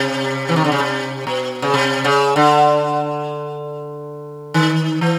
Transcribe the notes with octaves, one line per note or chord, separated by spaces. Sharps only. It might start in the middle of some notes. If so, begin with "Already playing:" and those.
Already playing: C3
E3
D#3
D3
C#3
C3
B2
C#3
C3
C#3
D3
D#3
E3